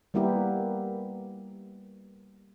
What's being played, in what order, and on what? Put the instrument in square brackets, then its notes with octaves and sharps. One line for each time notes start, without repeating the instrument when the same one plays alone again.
[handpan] G3 A#3 B3 E4 G4 A#4